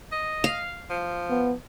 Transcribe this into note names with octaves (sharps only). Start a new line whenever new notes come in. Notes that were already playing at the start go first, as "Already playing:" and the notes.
D#5
F5
F3
B3